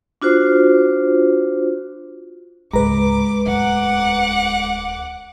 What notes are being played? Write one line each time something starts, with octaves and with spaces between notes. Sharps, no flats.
D4 F4 F#4 C5
C#2 G#2 G#3 B4 A#5 D6
D1 E2 F#5 D6